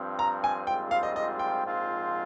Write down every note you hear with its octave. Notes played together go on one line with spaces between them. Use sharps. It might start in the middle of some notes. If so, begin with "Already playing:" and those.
Already playing: G2 F3 C4
A#5
G#5
A#1 G#2 G3 C4 F4 G5
F5
D#5
D#5
G5
A#1 G#2 F3 C4 F4